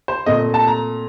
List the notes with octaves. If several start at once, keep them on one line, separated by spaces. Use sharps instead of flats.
C5
A#2 A3 C4 D#5
A5
A#5